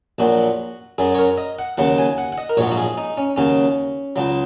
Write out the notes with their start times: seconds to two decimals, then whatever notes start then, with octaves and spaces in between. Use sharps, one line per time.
0.19 A#1 A#2 F#3 F#4
0.98 F#2 F#3 G#4
1.15 C#5
1.19 A#4
1.38 D#5
1.59 F#5
1.78 D#2 C#3 F#3 F#5
1.98 G#5
2.18 F#5
2.32 F#5
2.38 D#5
2.49 A#4
2.57 A#1 G#2 F#3 C#5
2.71 F#4
2.77 G#4
2.98 D#4
3.18 C#4
3.36 D#2 C#3 F#3 C#4
4.16 C#2 C#3 F#3